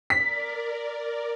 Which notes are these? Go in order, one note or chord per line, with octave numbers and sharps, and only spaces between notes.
A#4 D5 B6